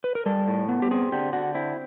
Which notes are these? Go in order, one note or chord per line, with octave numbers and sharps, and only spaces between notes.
B4
A#4
G3 A4
A2
B3
G4
C4 G#4
D3 G4
D3 F#4
C4 E4